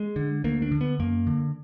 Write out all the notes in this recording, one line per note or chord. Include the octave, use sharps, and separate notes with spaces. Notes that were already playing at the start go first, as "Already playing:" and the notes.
Already playing: G#3
D3
D2 A#3
D4
D3
B3
F#2 A#3
D3